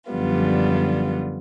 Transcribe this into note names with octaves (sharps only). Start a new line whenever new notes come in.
F#2 D3 F3 G3 B3 F4